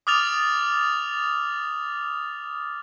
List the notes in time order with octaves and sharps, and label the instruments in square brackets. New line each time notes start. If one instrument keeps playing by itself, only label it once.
[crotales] D6 D#6 F6 A6 F7